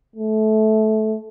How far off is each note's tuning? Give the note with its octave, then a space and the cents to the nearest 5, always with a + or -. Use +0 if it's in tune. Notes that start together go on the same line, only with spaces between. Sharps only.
A3 -20